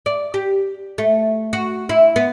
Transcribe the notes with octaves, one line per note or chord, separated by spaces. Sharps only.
D5
G4
A3
F#4
E4
B3